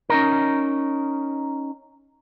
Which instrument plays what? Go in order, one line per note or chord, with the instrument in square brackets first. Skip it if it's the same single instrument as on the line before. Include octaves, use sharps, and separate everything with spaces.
[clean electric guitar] C#4 D#4 A#4